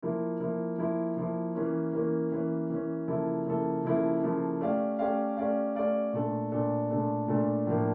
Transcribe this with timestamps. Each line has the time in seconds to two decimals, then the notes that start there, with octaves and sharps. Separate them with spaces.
0.02 F3 A#3 E4
0.40 F3 A#3 E4
0.78 F3 A#3 E4
1.17 F3 A#3 E4
1.55 E3 A#3 C#4
1.93 E3 A#3 C#4
2.32 E3 A#3 C#4
2.70 E3 A#3 C#4
3.08 C#3 F3 A#3 E4 A4
3.47 C#3 F3 A#3 E4 A4
3.85 C#3 F3 A#3 E4 A4
4.23 C#3 F3 A#3 E4 A4
4.61 A3 C#4 G4 D5 F5
4.99 A3 C#4 G4 D5 F5
5.37 A3 C#4 G4 D5 F5
5.75 A3 C#4 G4 D5 F5
6.13 A#2 A3 D4 A4
6.52 A#2 A3 D4 A4
6.90 A#2 A3 D4 A4
7.28 A#2 A3 D4 A4
7.67 A2 F3 A#3 D4